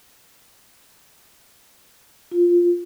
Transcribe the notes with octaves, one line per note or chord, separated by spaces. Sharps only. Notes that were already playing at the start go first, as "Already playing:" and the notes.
F4